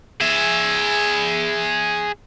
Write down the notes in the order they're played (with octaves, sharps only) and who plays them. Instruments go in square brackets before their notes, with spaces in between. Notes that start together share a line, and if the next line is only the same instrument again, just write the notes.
[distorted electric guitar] G#4 E5